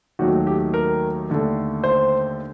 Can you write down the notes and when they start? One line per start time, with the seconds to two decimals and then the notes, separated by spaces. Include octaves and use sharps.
0.19 D#2 D#3 F#3 A3 F#4
0.47 G4
0.74 A#4
1.29 D#2 D3 A3
1.84 C5